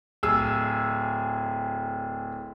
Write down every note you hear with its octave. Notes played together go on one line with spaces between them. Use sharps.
D1 G#4 E6